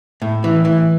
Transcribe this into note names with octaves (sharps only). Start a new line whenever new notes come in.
A2
E3
E3